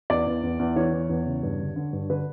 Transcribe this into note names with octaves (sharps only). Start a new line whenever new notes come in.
E2 D5
E2
E2
E2
E3 C#5
E2
E2
C#3
G2
D3
D3
G2
D3 B4